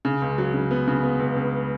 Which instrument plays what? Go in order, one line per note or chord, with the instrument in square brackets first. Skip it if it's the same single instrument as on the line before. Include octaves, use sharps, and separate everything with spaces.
[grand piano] C#3
C#2
F#3
C#3
B3
C#3
B3
C#2
C#2